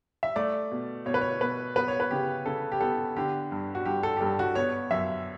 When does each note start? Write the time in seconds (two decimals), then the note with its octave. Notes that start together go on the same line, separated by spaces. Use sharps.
0.23 E5
0.36 A3 D5
0.71 B2
1.06 B2 C#5
1.14 B4
1.21 C#5
1.41 B2 B4
1.76 B3 B4
1.88 C#5
2.00 B4
2.11 C#3 G4
2.46 C#3 A4
2.72 G4
2.81 B3 A4
3.16 D3 G4
3.52 G2
3.75 F#4
3.85 G2 G4
4.03 A4
4.17 G4
4.21 G2 A4
4.39 F#4
4.55 B3 C#5
4.91 F#2 E5